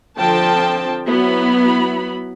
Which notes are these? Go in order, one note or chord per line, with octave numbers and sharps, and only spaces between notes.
D3 F3 C4 G5 A5
F#3 B3 E4 B5